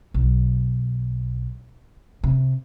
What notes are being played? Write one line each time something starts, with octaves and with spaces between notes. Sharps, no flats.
B1
C3